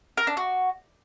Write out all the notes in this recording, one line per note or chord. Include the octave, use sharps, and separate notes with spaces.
A#4
D4
F#4